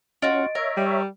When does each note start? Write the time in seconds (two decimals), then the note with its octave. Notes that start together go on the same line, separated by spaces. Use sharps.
0.22 C#4 F4 F#4 D#5 A6 D7
0.55 A#4 C#5 E5
0.77 G3